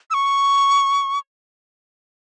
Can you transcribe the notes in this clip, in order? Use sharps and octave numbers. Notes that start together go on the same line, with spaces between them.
E6
C#6